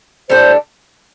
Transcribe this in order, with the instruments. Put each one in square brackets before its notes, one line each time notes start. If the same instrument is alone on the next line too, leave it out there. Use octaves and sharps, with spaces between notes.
[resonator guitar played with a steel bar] A2 G3 D4 A4 [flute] C5